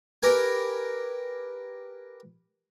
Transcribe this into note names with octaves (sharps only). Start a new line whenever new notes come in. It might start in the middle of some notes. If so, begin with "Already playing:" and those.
G4 A#4 B4 G#5